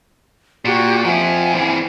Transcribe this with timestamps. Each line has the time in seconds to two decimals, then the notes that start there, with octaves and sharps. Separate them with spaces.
0.65 A#2 F#4 G4 C#6
1.05 F3 C4 E5 F#5 G#5
1.54 E3 C4